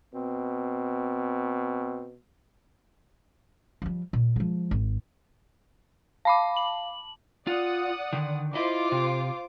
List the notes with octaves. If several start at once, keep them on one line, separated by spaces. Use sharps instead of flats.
B2 C4
F3 G3
A#2
F3 G#3
G#1
F5 A5 B5 D6
F#7
F4 D5 F#5 D#6
D3 D#3
E4 F4 C5 D#5 D6
C3